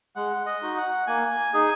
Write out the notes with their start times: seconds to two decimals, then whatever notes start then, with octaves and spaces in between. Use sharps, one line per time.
0.16 G#3 F#5
0.46 D#5
0.62 D#4 F#4
0.78 F#5
1.07 A#3 G#5
1.54 D#4 G#4